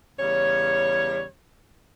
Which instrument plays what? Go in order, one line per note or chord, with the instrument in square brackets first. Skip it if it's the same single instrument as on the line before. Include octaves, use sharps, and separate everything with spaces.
[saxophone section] E2 C#3 G3 C#5